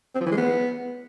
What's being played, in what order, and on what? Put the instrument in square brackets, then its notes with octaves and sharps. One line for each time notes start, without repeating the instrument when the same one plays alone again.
[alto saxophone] C4
F3
E3
G#3
B3